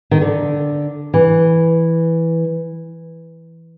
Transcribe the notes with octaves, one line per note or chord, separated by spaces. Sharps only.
D#3
D3
E3